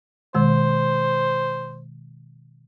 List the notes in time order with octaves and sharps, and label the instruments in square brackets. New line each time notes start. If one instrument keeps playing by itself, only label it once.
[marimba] B2 D#3 G#3 [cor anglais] C5